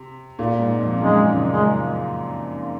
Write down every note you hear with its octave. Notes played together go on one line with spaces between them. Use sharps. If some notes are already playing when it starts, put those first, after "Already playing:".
Already playing: C3
A#2
G#2
F2
F#2 G#3
C#3
G#3